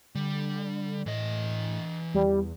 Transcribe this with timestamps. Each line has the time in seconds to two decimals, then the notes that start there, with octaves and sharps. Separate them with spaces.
0.15 D3 G3
1.06 A2 E3 D#5
2.14 E2 G3